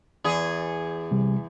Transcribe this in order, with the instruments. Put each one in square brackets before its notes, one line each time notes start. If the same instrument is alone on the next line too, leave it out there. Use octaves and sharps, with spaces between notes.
[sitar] E2 G#4
[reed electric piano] C3 G3